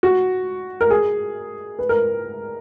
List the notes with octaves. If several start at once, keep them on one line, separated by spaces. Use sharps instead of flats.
F#4
A#4
G#4
B4
A#4